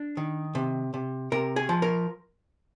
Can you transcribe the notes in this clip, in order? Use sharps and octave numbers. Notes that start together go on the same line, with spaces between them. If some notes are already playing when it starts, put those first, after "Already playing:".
Already playing: D4
D#3
C3
C3
C3 A#4
G#4
F3
A#4